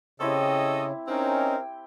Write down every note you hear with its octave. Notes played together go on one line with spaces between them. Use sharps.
C#3 C4 E4 G4 A4 C#5 D#5
C4 C#4 D#4 A#4 G5